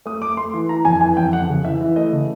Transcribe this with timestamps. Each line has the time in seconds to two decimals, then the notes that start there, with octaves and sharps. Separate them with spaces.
0.06 A3 D#6
0.22 A3 D6
0.37 A3 C6
0.54 E3
0.69 E3 A#5
0.85 F2 G#5
1.01 E3 G#5
1.17 F2 G5
1.33 F2 F#5
1.49 C#3
1.65 E3 E5
1.81 E3
1.96 A3 D#5
2.13 C#3